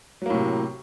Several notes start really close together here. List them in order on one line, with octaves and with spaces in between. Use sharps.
F#3 A#3 A2 C3